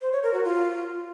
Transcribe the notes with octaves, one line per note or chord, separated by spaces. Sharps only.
C5
C#5
A#4
F#4
F4